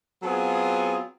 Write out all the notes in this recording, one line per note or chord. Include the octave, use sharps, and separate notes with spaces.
F#3 B3 C4 F4 G#4